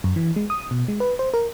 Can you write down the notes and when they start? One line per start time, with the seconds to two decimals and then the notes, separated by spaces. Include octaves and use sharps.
0.04 F#2
0.16 E3
0.36 G#3
0.50 D#6
0.71 B2
0.88 G#3
1.00 B4
1.19 C5
1.34 A#4